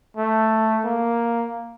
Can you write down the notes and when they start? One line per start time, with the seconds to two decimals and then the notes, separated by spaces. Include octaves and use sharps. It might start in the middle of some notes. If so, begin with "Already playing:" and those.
0.17 A3
0.84 A#3